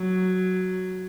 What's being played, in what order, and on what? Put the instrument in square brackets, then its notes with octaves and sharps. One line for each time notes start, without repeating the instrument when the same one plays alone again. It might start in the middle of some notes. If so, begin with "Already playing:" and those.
Already playing: [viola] F#3